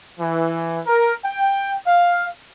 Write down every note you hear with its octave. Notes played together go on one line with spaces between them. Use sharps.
E3
A#4
G5
F5